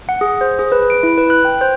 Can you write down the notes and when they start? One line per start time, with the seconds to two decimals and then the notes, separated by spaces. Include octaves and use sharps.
0.09 F#5
0.21 G#4
0.41 C5
0.59 G#4
0.72 B4
0.90 D7
1.03 E4
1.18 B4
1.30 F#6
1.45 G5
1.61 C5